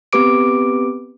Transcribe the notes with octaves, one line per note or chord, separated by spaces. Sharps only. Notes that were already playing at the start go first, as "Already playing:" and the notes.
B3 C4 G4 B4 D6 D7